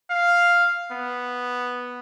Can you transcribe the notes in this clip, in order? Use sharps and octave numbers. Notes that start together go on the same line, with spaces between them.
F5
B3